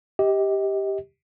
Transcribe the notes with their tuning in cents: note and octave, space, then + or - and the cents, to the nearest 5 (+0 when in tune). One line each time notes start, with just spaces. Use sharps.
G4 +0 D#5 +30